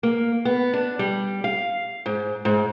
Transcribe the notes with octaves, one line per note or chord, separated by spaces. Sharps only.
A#3
B3
D4
G3
F5
G#2
G#2